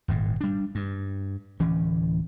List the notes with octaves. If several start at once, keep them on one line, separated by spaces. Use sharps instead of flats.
D#1 G#1 A2
G3 D4
G2
D1 E3 C#4